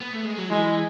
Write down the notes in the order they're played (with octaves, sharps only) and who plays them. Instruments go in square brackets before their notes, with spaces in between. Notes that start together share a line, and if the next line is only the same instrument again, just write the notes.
[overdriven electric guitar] B3
A3
G#3
F#3
[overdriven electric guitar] E3 [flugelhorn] G#3